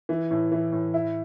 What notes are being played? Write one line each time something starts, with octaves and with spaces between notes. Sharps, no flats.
E3
A2
E3
A2
E4